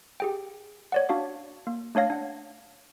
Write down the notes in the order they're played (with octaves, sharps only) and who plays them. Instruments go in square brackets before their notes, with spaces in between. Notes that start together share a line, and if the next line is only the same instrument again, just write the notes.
[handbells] G4 G#4 G5
C#5 D5 F#5
D4 F#4 F5 D6
A#3
A3 D4 C#5 F5 A#6
D4 F#5